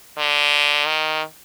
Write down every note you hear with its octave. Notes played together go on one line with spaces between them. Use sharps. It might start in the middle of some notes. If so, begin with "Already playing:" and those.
D3
D#3